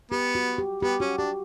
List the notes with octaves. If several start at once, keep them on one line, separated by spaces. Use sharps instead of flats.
B3 G4
F#4
G4
B3 G4
C#4 F#4
D4 G4